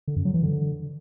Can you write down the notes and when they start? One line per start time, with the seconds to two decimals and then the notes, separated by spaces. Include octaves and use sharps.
0.08 D3
0.16 F#2
0.25 F#3
0.34 E3
0.43 D3